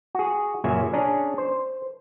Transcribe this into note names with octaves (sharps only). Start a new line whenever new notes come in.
F#4 G#4
F#2 A#2 C#3 E5 G#5
C#4 D4 G#4 A#5
C5